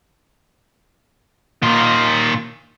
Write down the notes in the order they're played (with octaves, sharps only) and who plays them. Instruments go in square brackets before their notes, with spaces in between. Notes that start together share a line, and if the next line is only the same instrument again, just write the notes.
[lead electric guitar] A#2 A#3 [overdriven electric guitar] D#3 F4